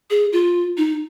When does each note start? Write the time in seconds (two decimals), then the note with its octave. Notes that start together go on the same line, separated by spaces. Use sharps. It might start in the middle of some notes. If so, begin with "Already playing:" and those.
0.10 G#4
0.33 F4
0.77 D#4